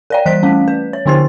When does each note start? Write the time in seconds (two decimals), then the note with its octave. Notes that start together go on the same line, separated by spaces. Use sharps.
0.10 A#4 D5 G5
0.26 E3 G3 F#6 B6
0.43 A3 C#4
0.68 B4
0.93 C#5
1.06 D3 B3 E4 C5 A6